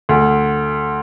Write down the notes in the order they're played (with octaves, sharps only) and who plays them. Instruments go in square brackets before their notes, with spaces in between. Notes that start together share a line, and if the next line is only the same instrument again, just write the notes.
[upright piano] D2